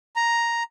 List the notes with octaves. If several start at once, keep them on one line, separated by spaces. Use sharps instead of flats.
A#5